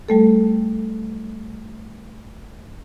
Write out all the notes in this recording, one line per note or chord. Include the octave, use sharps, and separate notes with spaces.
G3 A3 A4